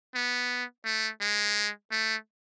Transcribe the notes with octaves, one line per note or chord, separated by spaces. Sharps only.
B3
A3
G#3
A3